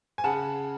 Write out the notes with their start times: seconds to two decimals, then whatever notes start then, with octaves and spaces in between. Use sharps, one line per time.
0.18 G#5
0.24 C#3 F#5 A5